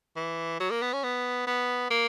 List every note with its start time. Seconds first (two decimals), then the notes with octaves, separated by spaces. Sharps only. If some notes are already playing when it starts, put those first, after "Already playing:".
0.16 E3
0.60 F#3
0.71 A#3
0.82 B3
0.93 C#4
1.03 B3
1.47 B3
1.90 A#3